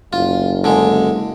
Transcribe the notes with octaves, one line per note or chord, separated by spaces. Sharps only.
F#1 F4
D3 G#3